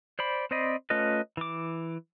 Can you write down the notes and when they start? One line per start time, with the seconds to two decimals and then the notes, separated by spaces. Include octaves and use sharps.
0.19 C5 D5 B5
0.51 C4 C5 D5 D#5 B5
0.90 A3 C#4 F4 B4 D#5
1.37 E3 D6